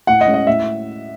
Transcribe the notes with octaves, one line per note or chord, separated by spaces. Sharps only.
A2 F#5
D#5
G#3 C#4
D#5
A2 E5